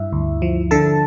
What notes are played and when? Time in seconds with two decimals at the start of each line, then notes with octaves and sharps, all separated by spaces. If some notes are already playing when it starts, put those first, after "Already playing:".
Already playing: G2 E4 E5
0.13 D2
0.42 F3
0.71 D3 A4 A5